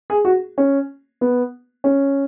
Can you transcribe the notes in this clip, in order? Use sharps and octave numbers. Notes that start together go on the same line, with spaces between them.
G#4
F#4
C#4
B3
C#4